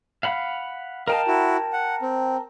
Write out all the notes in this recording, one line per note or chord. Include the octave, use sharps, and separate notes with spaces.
F5 F#5 B5
A#4 D#5 F5 G5 A5
E4 F#4
F#5
C4